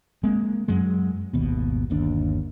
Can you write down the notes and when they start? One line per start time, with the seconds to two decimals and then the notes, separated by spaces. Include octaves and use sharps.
0.23 G#3 A#3 C4
0.68 F#2 F#3 G#3
1.33 G#1 D#2 B2
1.90 G1 D#2 D4